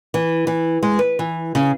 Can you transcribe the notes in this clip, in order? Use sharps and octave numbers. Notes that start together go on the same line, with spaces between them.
E3
E3
G#3
B4
E3
C#3